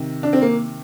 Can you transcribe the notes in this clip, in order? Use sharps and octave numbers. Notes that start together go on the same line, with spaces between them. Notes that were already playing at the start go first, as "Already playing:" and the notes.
Already playing: C3 D#3
D4
C4
A#3